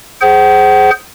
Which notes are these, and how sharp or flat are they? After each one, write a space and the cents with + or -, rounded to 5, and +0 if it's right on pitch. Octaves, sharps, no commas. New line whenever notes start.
G#4 +10 C5 +0 F#5 +45